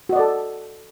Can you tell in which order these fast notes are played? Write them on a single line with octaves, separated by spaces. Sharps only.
F#4 D#5 D5 A4